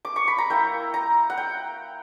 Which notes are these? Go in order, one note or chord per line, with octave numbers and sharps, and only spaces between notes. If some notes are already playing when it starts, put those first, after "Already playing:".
D6
C#6
B5
A#5
A#3 E4 G5
A#5
F#5
G5